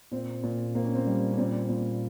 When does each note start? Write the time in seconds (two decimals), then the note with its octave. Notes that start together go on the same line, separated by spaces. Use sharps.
0.11 A#2 C4
0.43 A#2
0.75 A#3 C4
0.85 C#4
0.95 C4
1.06 G3
1.32 C#4
1.38 A#2 C4
1.69 A#2